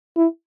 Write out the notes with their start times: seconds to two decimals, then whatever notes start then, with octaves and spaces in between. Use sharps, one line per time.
0.16 E4